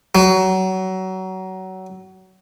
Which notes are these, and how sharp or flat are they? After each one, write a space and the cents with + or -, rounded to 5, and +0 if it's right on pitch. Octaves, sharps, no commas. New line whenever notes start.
F#3 +25